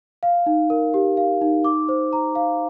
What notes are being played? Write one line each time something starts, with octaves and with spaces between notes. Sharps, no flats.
F5
D#4
A#4
G4
F5
D#4
D6
C5
A#5
F5